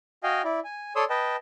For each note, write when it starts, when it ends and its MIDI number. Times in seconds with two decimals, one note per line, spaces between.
0.24 0.42 66
0.24 0.42 75
0.24 0.42 77
0.24 0.42 79
0.24 0.42 80
0.44 0.60 64
0.44 0.60 74
0.64 0.93 80
0.96 1.05 69
0.96 1.05 73
0.96 1.05 74
0.96 1.05 84
0.96 1.05 87
0.96 1.05 88
1.10 1.36 71
1.10 1.36 75
1.10 1.36 79
1.10 1.36 81